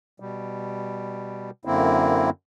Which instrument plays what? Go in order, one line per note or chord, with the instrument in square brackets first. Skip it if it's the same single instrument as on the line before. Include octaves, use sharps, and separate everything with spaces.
[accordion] B2 G3
F#2 D3 A#3 C4 E4